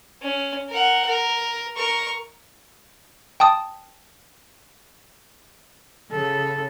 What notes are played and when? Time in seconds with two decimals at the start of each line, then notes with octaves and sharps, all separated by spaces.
0.22 C#4
0.69 A#4 F#5
1.07 A#4
1.77 A#4 C#6
3.40 G5 A5 D#6
6.12 C#3 A4